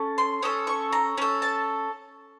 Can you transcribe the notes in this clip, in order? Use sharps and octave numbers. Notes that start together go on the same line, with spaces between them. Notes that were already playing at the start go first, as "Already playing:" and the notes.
Already playing: C#4 A4
C6
C#4 A4 D#6
C#6
A#5
C#4 A4
A5